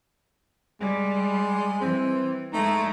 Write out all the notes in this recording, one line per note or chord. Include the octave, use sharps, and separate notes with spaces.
G3 G#3
E3 C4
G#3 A3 D#4